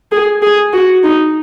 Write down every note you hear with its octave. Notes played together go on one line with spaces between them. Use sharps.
G#4
G#4
F#4
D#4